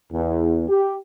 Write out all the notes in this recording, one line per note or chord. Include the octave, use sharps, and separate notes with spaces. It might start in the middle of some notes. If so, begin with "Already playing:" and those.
E2
G4